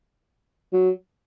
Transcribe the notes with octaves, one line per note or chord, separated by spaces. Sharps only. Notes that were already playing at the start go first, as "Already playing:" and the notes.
F#3